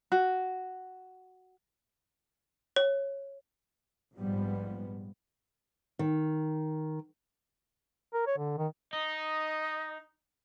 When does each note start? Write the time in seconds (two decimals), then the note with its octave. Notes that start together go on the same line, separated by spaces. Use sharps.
0.12 F#4
2.76 C#5
4.15 A#1 G#2 F3 G3 B3
5.99 D#3
8.13 A#4
8.27 C#5
8.38 D3
8.58 D#3
8.93 D#4 D#5